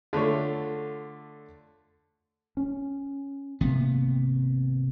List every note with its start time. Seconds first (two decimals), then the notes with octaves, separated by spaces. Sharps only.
0.13 D3 A3 F4 C#5
2.57 C#4
3.61 G#1 C3 A#3 B3